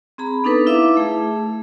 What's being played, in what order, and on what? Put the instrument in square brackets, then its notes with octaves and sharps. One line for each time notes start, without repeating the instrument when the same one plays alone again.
[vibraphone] C4 G#4 A#5 B5
B3 D4 D#4 A4 B4
E4 E5 F5 D6
A3 G#4